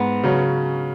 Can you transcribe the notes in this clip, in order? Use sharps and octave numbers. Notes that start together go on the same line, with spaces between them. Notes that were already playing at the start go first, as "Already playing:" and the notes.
Already playing: G#2 B3
C#3 F#3 C#4